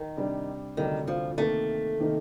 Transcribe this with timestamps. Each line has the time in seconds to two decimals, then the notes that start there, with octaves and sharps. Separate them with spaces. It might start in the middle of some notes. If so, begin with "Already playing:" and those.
Already playing: D#3
0.17 C3 G3 D4
0.77 D2 C3 D#3 G3 D4
1.07 F3
1.38 C3 D#3 A3 A#3
1.99 C3 D#3 A#3 D#4